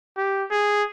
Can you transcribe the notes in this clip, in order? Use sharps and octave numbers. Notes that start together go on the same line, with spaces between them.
G4
G#4